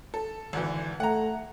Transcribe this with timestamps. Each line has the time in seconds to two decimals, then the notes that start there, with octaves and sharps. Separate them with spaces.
0.14 A4
0.53 G#1 D3 E3
1.00 A3 F#5 A#5